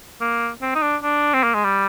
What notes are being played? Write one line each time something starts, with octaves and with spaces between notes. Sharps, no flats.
A#3
C4
D#4
D4
D4
C4
A#3
G#3
G3